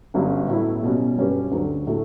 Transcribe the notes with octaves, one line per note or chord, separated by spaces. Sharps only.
G1 G2 F#3 C#4
A2 F#3 B3 E4
B2 G3 C#4 F#4
G2 F#3 C#4 G4 B4
D2 D3 F#3
A2 F#3 A3